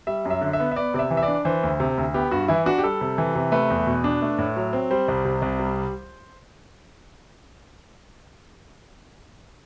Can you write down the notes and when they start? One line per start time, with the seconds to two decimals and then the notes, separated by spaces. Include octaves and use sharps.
0.07 G3 E5
0.25 F#2
0.30 E5
0.41 D3
0.53 E5
0.60 B3
0.71 E5
0.76 B3 D5
0.94 C3 D5
0.99 E5
1.10 E3
1.17 E5
1.23 D5
1.28 D4
1.45 E3 C5
1.63 D2
1.80 C3
1.98 D2
2.14 B3 G4
2.31 G2 F#4
2.48 E3 E4
2.66 D4 F#4
2.78 G4
2.84 G3 A4
3.01 C3
3.18 E3
3.35 C3
3.52 A3 B4
3.70 E2
3.86 B2
4.04 D4
4.22 A3
4.38 A2
4.56 F#3
4.73 C4
4.91 G3 C5
5.08 C2
5.25 C3
5.42 C2
5.59 G3